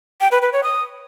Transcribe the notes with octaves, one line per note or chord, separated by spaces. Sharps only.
G5
B4
B4
C#5
D#6